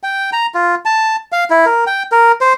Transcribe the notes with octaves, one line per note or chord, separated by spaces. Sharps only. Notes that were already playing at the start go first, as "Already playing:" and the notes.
G5
A#5
F4
A5
F5
E4
A#4
G5
A#4
C5